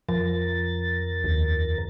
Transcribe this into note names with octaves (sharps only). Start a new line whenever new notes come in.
F2 F3 A#4 A6
D#2